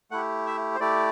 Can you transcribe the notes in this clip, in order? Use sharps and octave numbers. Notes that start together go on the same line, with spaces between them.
A3 E4 G4 F#5
E5
C5
A3 E4 G4 D5